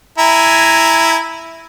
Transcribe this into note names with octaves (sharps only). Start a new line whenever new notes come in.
E4 G#5 A#5